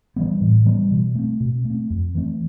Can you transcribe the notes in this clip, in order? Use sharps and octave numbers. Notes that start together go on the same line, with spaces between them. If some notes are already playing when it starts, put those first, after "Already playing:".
E3 G3 B3
A2
E3 G3 B3
B2
A3 C4
B2
A3
C4
F2
E3 A3 C4